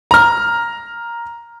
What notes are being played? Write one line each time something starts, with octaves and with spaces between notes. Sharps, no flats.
A#5 F6